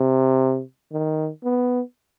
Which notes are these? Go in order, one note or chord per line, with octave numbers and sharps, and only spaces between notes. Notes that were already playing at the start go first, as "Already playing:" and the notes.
Already playing: C3
D#3
B3